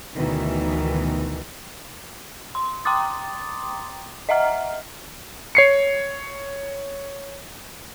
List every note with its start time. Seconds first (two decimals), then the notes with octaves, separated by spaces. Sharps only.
0.15 D2 B2 D#3 E3
2.55 C6
2.85 G5 A#5 C6 D6 D#6 A6
4.29 D#5 E5 F#5 A#5 F6
5.55 C#5 C7 C#7